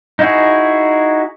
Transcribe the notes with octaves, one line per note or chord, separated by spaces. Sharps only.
D#4 E4 F#4 G#4